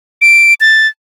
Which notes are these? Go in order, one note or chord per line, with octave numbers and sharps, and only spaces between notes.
D7
A6